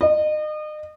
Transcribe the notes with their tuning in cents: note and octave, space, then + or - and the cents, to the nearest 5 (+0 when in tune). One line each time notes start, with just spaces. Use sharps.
D#5 -35